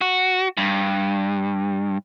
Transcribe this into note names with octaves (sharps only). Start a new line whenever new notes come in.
F#4
G2